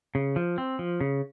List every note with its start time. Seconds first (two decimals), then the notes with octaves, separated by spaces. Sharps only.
0.15 C#3
0.36 F3
0.58 C4
0.79 F3
1.01 C#3